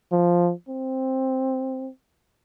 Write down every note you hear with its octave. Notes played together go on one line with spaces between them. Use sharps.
F3
C4